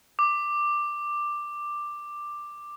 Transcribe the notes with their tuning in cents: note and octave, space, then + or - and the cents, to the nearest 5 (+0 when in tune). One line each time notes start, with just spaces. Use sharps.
D6 +10